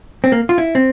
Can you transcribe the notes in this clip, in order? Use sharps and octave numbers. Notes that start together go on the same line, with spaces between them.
C4
A#3
F4
E4
C4